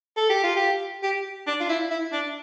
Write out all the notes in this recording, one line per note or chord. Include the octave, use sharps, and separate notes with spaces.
A4
G4
F4
G4
G4
D4
F4
E4
E4
D4